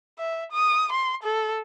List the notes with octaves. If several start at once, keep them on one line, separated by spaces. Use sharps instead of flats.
E5
D#6
C6
A4